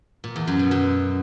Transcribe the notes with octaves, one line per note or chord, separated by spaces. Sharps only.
A#2
E2
F#2
B2
F#2